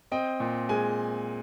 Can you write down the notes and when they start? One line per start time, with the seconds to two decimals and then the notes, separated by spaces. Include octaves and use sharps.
0.11 C4 D#5 G5
0.40 A#2
0.69 G#3 G#5